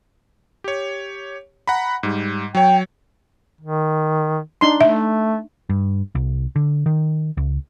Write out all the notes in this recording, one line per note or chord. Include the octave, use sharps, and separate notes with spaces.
G4 C#5
F#5 A#5 B5
G#2 G3
F#3 C#5 G5
D#3
D4 D#4 C6
A3 E5
G2
C2
D3
D#3
C#2